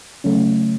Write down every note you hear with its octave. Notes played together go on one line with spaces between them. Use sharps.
C#3 F#3 A3 C#4